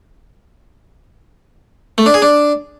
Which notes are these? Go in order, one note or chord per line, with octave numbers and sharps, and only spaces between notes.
A3
D4
G#4
D4